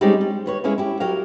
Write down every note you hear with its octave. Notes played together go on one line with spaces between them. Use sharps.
G3 G#3 C4 C#4 D#4 G4
G3
D#2 B4 C#5
G#3 A#3 C#4 E4
E4 G4
F#3 G4 A#4 F5